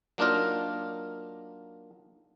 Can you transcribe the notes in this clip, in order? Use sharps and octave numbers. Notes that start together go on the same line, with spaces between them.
F#3 A#3 D4 D#4 F4 A#4